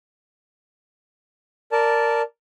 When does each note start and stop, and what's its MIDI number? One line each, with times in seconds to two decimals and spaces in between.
1.72 2.22 70
1.72 2.22 74
1.72 2.22 81